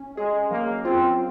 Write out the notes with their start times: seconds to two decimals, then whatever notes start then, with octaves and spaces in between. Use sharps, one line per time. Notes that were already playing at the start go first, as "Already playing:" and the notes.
Already playing: C#4
0.17 G#3 G#4
0.51 F#3 A#3
0.84 C4 F4